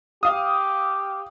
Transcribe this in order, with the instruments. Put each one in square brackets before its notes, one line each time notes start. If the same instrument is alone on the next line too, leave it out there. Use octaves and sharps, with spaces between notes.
[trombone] G4 [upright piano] F5 D#6